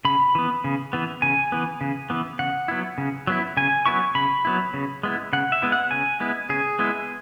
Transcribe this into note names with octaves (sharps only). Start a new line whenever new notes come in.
C#3 B5
E3 B3
C#3
E3 B3
C#3 G#5
E3 B3
C#3
E3 B3
C#3 F#5
F#3 B3 E4
C#3
F#3 B3 E4
C#3 G#5
F#3 B3 E4 C#6
C#3 B5
F#3 B3 E4
C#3
G#3 B3 E4
C#3 F#5
E5
G#3 B3 E4
F#5
C#3 G#5
G#3 B3 E4
C#3 G#4
G#3 B3 E4